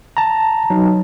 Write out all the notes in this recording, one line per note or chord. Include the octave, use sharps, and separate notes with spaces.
A5 A#5
F#3 D#4